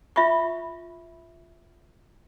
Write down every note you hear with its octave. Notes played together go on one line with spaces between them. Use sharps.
F4 E5 B5 C#6